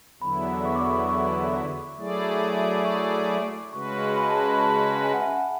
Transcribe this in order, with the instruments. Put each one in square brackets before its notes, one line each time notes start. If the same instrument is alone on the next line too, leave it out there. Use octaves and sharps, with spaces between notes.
[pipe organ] E2 D3 F#3 B3 E4 [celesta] B5
[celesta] C#6
D6
C#6
C#6
[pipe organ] F#3 A3 E4 G#4 D5
[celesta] D6
C#6
D6
[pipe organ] C#3 G#3 C#4 F#4 B4 [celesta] C#6
[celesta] B5
A5
B5
B5
A5
G#5
F#5
E5
F#5